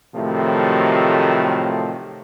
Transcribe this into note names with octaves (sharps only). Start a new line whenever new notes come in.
A2 C3 D#3 F3 F#3 A3